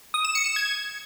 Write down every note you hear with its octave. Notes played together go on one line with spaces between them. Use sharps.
D#6
E7
C#7
E7
G#6